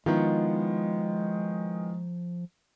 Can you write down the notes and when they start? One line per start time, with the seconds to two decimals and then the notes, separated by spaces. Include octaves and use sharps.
0.06 D#3 F3 G#3 B3 E4 F4